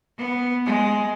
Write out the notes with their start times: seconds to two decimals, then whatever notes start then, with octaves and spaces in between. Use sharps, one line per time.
0.19 B3
0.66 G#3